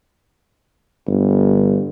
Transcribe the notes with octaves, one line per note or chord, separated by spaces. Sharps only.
G1